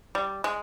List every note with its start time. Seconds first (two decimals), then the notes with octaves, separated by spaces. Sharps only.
0.15 G3
0.44 G#3